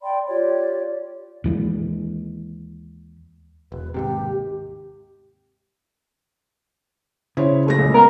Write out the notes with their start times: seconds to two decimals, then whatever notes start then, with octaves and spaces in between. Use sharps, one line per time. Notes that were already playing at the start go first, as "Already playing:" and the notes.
0.02 D5 G5 B5 C6
0.28 F4 G4 C#5 D5
1.44 D#2 E3 G#3
3.72 E1 B4
3.94 D#2 G#2 C3 G4
7.37 C#3 E4 C5 C#5
7.66 F#1 A3 A#6
7.79 C#2
7.94 B3 A#4